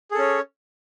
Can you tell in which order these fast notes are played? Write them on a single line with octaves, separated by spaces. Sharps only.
G#4 A4 C#4 C#5